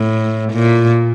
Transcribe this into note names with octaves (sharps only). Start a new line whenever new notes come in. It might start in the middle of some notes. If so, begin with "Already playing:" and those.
Already playing: A2
A#2